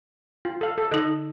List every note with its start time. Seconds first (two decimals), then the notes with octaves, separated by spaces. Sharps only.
0.45 F4
0.61 A4 F5
0.78 A4
0.91 D3 D#4 A4 D#5